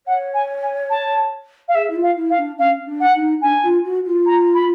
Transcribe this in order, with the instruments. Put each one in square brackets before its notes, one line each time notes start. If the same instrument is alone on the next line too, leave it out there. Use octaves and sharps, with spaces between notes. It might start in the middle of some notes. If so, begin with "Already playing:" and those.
[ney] C#5 [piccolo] F#5
[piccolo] G#5
G#5
A5
F5
[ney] G#4 [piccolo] E5
[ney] E4
F4
[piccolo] F5
[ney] E4
[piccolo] F5
[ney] D4
[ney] C#4 [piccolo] F5
[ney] D4
[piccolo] F#5
[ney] D#4
[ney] D4 [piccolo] G#5
[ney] F4
F#4
F4
[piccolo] A#5
B5